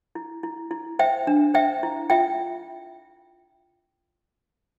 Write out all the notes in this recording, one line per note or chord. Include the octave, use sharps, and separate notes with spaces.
E4
E4
E4
C5 E5 G5
D4
C5 E5 G5
E4
F4 E5 G5